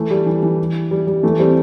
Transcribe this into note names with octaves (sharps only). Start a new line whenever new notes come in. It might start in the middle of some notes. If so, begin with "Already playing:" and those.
Already playing: E3 A3
G3
E3
E3
G3
G3
E3 A3
G3 C4